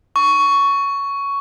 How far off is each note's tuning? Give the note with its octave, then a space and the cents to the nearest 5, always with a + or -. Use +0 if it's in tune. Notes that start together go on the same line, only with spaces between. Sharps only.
C#6 +10